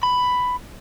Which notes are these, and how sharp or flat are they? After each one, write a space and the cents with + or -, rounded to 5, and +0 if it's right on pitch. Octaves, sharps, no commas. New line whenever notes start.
B5 +10